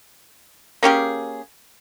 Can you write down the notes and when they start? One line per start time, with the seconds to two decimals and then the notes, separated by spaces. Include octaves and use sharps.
0.83 A#3 C#4 G4 G#4